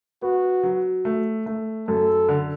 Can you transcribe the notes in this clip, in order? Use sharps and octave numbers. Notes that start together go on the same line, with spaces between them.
B3 F#4
F#3
A3
A3
F#2 A4
D3